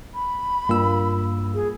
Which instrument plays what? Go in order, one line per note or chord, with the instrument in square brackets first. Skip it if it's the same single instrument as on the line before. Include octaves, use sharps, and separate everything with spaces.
[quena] B5
[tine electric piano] G2 E6 [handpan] A#3 F4
[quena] G#4